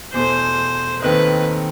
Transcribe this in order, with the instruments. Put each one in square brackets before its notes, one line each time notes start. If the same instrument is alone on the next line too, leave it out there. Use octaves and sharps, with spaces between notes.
[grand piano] E2 B2 A3 [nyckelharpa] C5
[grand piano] D#2 D#3 A3 C4 D#4 [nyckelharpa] B4